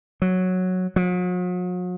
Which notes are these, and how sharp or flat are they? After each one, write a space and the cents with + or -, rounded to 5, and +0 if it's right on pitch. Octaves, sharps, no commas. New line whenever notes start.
F#3 -5
F#3 -45